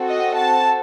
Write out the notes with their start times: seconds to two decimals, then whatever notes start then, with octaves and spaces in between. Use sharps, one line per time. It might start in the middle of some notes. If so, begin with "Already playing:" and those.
Already playing: C4 F#4 A4
0.09 D#5
0.38 A5